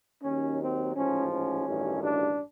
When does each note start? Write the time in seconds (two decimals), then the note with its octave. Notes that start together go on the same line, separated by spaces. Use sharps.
0.23 D#2 D#3 F#3 C#4
0.60 C4
0.95 A1 G#2 F3 C#4
1.30 C#4
1.66 A1 G2 D#3 F#3
2.02 D4